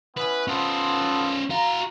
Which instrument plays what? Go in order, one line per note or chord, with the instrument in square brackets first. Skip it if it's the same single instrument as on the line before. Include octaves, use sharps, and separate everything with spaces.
[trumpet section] B3 C#4 E4 [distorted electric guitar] B4
[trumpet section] B3 F4 A4 [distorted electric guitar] C#4 C5
[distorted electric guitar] F#4 F5 [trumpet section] A#5